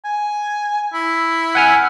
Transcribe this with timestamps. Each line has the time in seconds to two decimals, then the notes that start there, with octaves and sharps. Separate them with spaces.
0.05 G#5
0.93 E4
1.55 F#5 G#5 F6